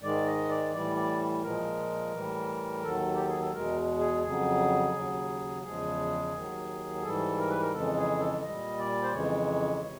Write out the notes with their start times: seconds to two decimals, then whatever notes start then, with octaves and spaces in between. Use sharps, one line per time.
0.02 G#2 D#3 G#3 D5
0.26 D#5
0.49 D5
0.73 A2 E3 G3 D5
0.96 D5
1.42 A#2 F3 G#3 A#4
2.12 A2 E3 G3
2.83 D#2 D#3 F#3 A4
3.14 G4
3.27 G#4
3.40 A4
3.52 E2 B2 G#3 A#4
3.99 G#4
4.22 F2 C#3 F#3 G#4
4.93 D#2 C#3 F#3
5.62 E2 C#3 F3 G#3 G#4
6.33 D#2 D#3 F#3
7.02 G#2 E3 G3 A4
7.38 A#4
7.50 B4
7.60 A#4
7.72 F2 C#3 E3 G#3 A4
7.97 G#4
8.19 A4
8.42 A#2 G3 D#5
8.78 D5
9.03 C5
9.12 F2 C#3 E3 G#3 C#5
9.84 C3